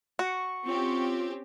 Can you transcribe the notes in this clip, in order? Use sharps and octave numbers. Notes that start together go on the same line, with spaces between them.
F#4 C#6
C4 C#4 F4 G4